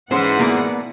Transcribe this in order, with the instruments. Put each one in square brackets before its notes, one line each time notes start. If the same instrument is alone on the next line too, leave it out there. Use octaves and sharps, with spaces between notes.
[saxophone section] G#2 [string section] E3 F#5 [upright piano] C#4 [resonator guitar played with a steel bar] C5
[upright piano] B2 [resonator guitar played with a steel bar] A#3 B3 D5